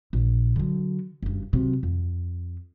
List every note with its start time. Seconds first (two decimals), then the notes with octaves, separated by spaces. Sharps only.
0.13 A#1
0.56 D3 F#3
1.23 F#1 G2
1.53 C3 F#3
1.83 F2